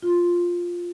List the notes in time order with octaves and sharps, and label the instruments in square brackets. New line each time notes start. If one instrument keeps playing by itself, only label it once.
[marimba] F4